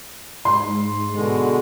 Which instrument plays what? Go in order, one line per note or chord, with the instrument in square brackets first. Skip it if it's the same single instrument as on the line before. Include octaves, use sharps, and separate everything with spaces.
[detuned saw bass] G#2 [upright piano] C6
[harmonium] B2 D3 G#3